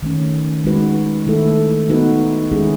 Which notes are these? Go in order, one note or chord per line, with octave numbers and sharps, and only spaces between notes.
D#3 A3 C#4
G#3 D#4 F#4 B4
D#3 A3 E4 A4
B3 D#4 F#4 B4
D#3 G#3 C#4 E4 G#4